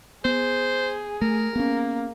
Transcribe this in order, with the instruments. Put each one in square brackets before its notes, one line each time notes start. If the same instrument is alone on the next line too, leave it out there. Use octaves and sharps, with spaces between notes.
[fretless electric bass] B3 [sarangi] G#4 [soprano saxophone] C5
[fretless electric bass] A3 [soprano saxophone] A#4
[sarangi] A#3 [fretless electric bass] B3 C#4